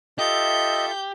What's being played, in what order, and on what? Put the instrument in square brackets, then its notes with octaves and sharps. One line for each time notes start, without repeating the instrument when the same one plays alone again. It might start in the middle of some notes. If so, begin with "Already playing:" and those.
[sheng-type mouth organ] F4 A4 E5 [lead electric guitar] G4 [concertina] D#5 [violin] G6